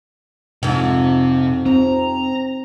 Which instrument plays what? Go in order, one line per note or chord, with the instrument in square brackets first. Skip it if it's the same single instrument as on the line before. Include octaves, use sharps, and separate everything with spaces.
[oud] F2 G#2 [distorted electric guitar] C3
[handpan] C4 [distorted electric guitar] A#5